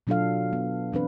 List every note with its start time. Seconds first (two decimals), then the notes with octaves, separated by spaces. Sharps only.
0.07 B2 F#3 D4 F4 A4 F5
0.53 B3
0.92 E3 C4 D4 B4